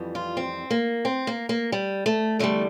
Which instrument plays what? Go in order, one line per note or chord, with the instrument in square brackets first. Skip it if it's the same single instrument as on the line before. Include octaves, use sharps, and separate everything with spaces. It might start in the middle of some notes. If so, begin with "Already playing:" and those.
Already playing: [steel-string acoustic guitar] F2 E3 G3
F4
C4
A#3
C4
A#3
A#3
G3
A3
E2 D3 G3 A3